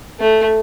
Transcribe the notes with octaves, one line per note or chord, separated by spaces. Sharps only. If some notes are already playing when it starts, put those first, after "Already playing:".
A3